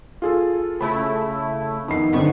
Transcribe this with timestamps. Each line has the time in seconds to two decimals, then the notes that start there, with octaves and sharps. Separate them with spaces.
0.22 F4 G#4 A4
0.81 C#3 A3 E4 B5
1.88 F2 D#3 B3 D#4 C7
2.12 G2 D3 B3 C4 D#4 C#6